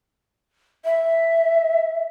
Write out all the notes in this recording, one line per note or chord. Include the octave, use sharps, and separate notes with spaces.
E5